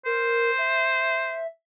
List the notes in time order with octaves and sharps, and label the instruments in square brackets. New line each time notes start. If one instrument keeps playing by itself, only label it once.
[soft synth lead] A#4 [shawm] C5
[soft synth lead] E5